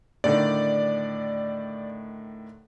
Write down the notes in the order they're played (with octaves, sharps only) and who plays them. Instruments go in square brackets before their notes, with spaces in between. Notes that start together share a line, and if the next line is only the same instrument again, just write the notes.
[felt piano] A2 D3 D#3 [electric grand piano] D5